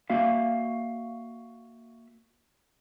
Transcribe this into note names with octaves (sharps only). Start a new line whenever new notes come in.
A#3 F#4 E5 F5